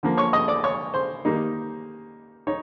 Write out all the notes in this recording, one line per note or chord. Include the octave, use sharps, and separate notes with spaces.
D3 F3 A#3
C#5 C#6
D#5 D#6
D5 D6
C#5 C#6
C5 C6
D#3 G3 A#3 D#4
D#4 C#5